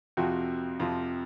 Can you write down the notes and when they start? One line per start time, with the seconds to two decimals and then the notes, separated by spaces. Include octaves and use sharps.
0.17 F2 C3 F3 F#4
0.80 F2 C3 F3